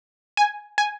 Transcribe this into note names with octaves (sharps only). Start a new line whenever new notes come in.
G#5
G#5